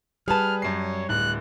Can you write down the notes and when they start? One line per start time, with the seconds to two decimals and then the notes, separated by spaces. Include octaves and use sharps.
0.28 G3 G#4 B4 A5 F6
0.62 F#2 C#5 C7
1.09 D1 F#6